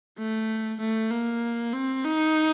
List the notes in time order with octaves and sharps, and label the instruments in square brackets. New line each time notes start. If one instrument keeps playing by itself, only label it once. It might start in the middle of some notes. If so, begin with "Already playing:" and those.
[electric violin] A3
A3
A#3
C4
D#4